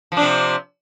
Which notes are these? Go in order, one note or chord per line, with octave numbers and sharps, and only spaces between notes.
C3 F3 D4